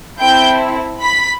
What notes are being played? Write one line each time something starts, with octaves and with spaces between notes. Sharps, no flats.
C4 E4 A4 G5 G6
B5 B6